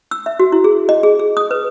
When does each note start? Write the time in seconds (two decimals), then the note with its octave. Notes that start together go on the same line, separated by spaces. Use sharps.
0.11 E6
0.26 E5
0.39 F#4
0.52 E4
0.64 G#4
0.89 D#5
1.03 G#4
1.19 G#4
1.37 D#6
1.51 B4